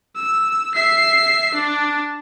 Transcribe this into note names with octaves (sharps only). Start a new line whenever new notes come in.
E6
E5 C7
D4